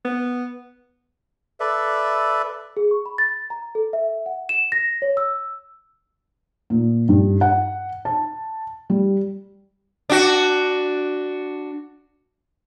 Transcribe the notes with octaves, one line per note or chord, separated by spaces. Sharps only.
B3
A4 B4 D5 E5
G#4
C#6
B5
A6
A#5
A4
E5
F#5
E7
A#6
C#5
E6
A#2
G2
F#5
A5
G3
D4 F#4